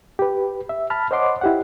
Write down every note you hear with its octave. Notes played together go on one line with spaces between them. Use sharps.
G4 B4
E5
A5 B5 F6
C5 C#5 D#5 F#5 C6 D6
E4 G4 F#5